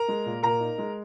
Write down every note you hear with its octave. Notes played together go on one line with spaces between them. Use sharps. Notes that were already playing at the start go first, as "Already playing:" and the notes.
Already playing: A#4 A#5
G#3
A#2
A#2 A#4 A#5
D#4
G#3